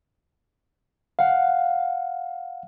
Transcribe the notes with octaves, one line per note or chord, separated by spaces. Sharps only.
F5 F#5